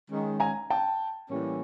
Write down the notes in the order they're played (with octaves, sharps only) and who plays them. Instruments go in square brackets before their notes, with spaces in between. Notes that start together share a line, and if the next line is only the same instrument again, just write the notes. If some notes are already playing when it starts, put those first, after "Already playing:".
[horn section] D#3 G#3 C#4
[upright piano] G#5 A#5
G5 A5
[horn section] A2 E3 G3 A#3 C#4